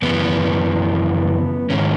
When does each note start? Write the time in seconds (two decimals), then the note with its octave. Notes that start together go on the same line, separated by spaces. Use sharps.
0.02 F#2 C#3 E3 B3
1.70 G#2 D#3 C#4